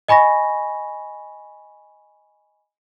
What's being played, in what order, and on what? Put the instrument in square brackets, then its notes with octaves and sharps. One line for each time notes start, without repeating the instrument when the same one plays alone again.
[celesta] D#5 G#5 B5 C#6 A#6